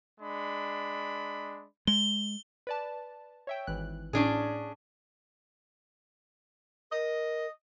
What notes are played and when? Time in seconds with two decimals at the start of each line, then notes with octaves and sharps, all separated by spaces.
0.20 G#3 D4 B5
1.87 G#3 G7
2.67 B4 D5 A5
3.47 C#5 E5 G5
3.67 G#1 E3 F#6
4.13 A2 C#4 D4 G#4
6.92 A#4 D#5